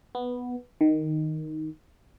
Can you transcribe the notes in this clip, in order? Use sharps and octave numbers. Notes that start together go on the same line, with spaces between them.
B3
D#3